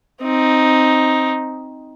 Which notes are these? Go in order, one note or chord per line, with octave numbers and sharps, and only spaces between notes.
C4 D#4